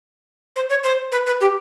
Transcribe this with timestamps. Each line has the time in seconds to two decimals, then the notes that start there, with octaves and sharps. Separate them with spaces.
0.56 C5
0.70 C#5
0.84 C5
1.12 B4
1.26 B4
1.41 G4